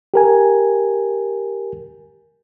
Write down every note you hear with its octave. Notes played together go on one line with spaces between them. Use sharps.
G4 A#4 G#5